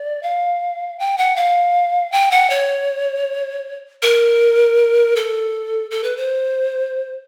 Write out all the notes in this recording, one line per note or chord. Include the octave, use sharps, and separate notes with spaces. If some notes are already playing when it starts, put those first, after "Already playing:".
Already playing: D5
F5
G5
F#5
F5
G5
F#5
C#5
A#4
A4
A4
B4
C5